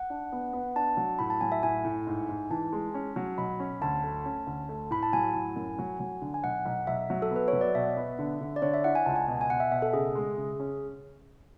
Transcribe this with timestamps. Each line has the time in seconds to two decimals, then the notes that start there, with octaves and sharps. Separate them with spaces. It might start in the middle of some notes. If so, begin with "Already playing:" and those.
Already playing: F#5
0.10 D4
0.32 B3
0.53 B3
0.76 D4 A5
0.97 F#3
1.19 A2 B5
1.30 A5
1.41 F#3 G#5
1.52 E5
1.63 A2 G#5
1.85 A2
2.07 G#2
2.29 G#2
2.50 E3 A5
2.73 G#3
2.94 C#4
3.16 F#3
3.38 B1 B5
3.60 C#4
3.82 D2 A5
4.04 A3
4.25 C#4
4.47 D2
4.69 A3
4.91 A2 B5
5.03 A5
5.13 F#3 G#5
5.34 A2
5.56 F#2
5.79 F#3
6.00 F#3
6.22 D3
6.34 G#5
6.43 B1 F#5
6.66 B1
6.87 B1 E5
7.10 F#3
7.22 A4
7.31 B3
7.36 B4
7.48 C#5
7.53 F#3
7.61 D5
7.75 B2 E5
7.97 B3
8.19 D3
8.41 D3
8.56 D5
8.62 D3 C#5
8.74 E5
8.84 E4 F#5
8.95 G#5
9.06 C#2 A5
9.16 G#5
9.27 B2
9.41 G#5
9.50 B2 F#5
9.60 E5
9.71 B2 E5
9.82 A4
9.93 C#3 G#4
10.15 G#3
10.37 C#3
10.60 C#4